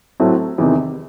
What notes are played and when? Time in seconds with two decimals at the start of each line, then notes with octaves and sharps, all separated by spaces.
0.20 A2 F#3 A3 C4
0.58 E2 C3 D#3